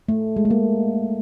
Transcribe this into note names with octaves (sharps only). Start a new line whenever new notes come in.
A3
G#3
A3
G#3 A#3